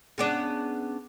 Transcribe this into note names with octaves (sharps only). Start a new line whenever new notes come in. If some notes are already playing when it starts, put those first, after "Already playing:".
C#3 B3 D4